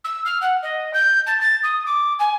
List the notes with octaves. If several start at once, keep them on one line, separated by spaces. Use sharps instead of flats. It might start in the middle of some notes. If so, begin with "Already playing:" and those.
E6
F6
F#5
D#5
G6
A5
A6
D#6
D6
G#5